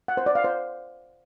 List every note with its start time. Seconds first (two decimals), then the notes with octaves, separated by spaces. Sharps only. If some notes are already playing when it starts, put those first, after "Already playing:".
0.08 F#5
0.17 C5
0.26 D5
0.35 F5
0.44 C5